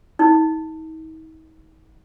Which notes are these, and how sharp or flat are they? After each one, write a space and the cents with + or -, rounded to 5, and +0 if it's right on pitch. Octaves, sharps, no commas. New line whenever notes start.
D#4 +40